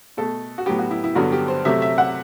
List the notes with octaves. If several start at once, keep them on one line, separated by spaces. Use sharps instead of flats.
B2 A3 A4
F#4
A2 F#3 B3 G4
F#4
E4
E4
G2 D3 F#3 B3 F#4
G4
C5
C3 F#3 A3 E5
E5
F#5